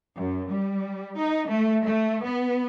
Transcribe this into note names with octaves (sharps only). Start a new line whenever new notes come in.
F#2
G3
D#4
A3
A3
B3